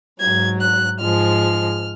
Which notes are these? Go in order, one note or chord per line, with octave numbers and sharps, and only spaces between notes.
G#2 F#3 G#6
F#6
G#2 F3 G#3 F6